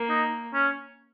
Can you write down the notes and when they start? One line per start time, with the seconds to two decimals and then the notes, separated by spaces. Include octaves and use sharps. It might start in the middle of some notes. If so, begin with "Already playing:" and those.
Already playing: A#3
0.09 D#4
0.54 C#4